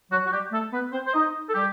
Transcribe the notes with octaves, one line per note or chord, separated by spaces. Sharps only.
F#3 F#4
F#4
G3 G4
A3 A4
B3 B4
C4 C5
C5
D#4 D#5
A4
G3 G4